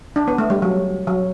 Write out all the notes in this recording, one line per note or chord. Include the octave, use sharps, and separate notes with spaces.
D4
B3
A3
G3
F#3
F#3